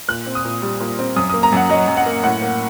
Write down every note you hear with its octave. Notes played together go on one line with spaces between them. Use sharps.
A#2 F#6
C4
D#6
A#2
G3
A#2
C4
F#2 D#6
A#3 D#6
A#5
F#2 F#5
F#3 D#5
F#2
F#5
A#3
A2 F#5
A#3